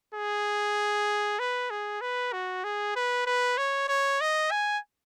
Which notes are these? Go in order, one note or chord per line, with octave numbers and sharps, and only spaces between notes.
G#4
B4
G#4
B4
F#4
G#4
B4
B4
C#5
C#5
D#5
G#5